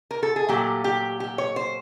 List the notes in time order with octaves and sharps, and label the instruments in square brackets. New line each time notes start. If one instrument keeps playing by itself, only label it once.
[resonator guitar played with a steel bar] A#4
A4
G#4
A#2 F#3 A3 G4
G4
G4
C#5
C5